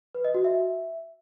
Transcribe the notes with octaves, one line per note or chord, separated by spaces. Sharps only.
B4
D#5
F#4
E5